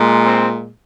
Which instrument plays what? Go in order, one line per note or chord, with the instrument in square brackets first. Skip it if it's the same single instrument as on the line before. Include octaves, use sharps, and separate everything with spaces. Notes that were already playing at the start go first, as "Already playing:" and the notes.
Already playing: [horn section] A#2 G#3
C4